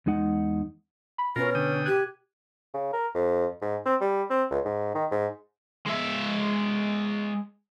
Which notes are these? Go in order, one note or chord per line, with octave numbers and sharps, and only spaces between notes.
E2 G#3 D#4 F#5
B5
B2 C#4 F4 A#4 B4
D3 G5 D#6
G4 F#6 G#6 D#7
C#3
A#4
F2
G#2
C4
G3
C4
C#2
G#2
D#3
G#2
G#3 E5